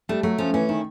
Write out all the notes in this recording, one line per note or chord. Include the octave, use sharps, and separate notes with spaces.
G3 A3
F#3 A3
F3 C#4
E3 C#4
D#3 E4